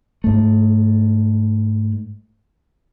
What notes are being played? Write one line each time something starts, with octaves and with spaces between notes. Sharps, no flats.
G#2 A3